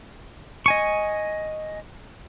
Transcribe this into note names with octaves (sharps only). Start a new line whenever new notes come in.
D#5 G#5 C#6